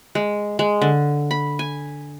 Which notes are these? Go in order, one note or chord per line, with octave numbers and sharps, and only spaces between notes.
G#3
G#3
D3
B5
G#5